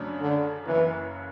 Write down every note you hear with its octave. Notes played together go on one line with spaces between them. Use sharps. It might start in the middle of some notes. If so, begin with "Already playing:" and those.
Already playing: F#2 C#3 F#3 A3 D4
D3
F#1 F#2 C#3 E3